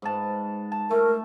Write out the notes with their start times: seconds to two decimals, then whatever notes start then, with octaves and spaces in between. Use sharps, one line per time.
0.02 G#2 B4 A5
0.72 A5
0.91 A3 A#4